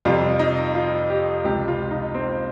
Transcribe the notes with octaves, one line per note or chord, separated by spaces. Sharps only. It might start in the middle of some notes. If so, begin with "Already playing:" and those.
F2 C3 G3 F4
D#4
F4
G4
C#2 C3 F3 G4
F4
D#4
C4